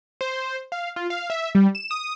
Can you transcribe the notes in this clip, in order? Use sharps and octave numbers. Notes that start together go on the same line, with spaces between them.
C5
F5
F4
F5
E5
G3
E7
D#6